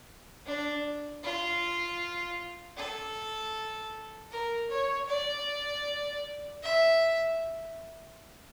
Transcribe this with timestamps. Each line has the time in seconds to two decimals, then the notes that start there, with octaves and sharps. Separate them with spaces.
0.46 D4
1.23 F4
2.77 A4
4.31 A#4
4.70 C#5
5.08 D5
6.63 E5